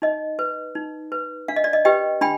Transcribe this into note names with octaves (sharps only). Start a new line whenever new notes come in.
D#4 D#5
B4
D#4
B4
D4 F5
D#5
D5
D#5
G4 B4 D#5 G5
D4 G5 B5